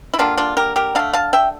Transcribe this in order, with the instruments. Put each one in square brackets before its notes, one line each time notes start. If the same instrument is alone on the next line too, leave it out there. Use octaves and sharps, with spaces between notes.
[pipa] E4
D3 G3 A#3 D4 F4
D4 F4
G4 A#4
G4 A#4
D3 F5 A5
A3
F5 A5
E5 G5